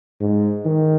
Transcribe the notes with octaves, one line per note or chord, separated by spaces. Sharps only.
G#2
D#3